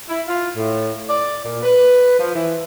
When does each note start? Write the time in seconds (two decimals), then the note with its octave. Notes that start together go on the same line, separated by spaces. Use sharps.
0.09 E4
0.28 F4
0.56 A2
1.08 D5
1.44 A#2
1.62 B4
2.18 F3
2.34 E3